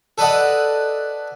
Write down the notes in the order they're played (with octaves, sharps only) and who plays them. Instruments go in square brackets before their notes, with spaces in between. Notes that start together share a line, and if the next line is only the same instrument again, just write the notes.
[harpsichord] A4 B4 D5 D#5 F#5